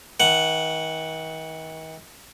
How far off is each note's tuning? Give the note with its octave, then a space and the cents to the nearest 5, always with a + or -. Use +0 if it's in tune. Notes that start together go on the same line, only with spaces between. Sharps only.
D#3 +45 F#5 +0